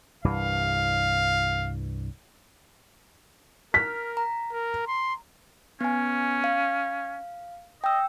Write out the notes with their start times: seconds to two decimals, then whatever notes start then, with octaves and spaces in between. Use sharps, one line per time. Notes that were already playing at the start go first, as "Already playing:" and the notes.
0.24 C2 G2 E3 F5
3.74 A#4 F6 B6
4.17 A#5
4.52 A#4
4.87 C6
5.81 B3 C#4 G#5
6.44 F5
7.84 D#5 G5 E6